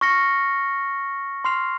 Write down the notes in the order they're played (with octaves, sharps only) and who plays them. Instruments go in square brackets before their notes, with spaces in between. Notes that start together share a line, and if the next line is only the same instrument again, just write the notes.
[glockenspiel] C#6 F6 A#6 C#7 G7
C6 F6 C7 F7